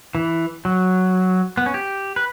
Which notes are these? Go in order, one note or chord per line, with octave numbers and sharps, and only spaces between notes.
E3
F#3
B3
C#4
G4
B4